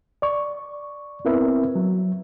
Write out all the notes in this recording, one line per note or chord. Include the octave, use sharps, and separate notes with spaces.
D5 C#6
B3 C4 E4 A#4 B4 E5
F#3